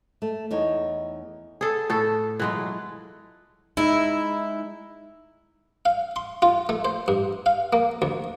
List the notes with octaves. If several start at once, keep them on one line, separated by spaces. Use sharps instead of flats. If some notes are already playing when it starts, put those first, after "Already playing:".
A3
E2 D#4 C#5
B3 G#4 A4
A2 A4
B2 E3 F#3 G#3 F4
G#3 D#4 E4
F5
C6
F4
A3
C5
G2
F5
A#3
D2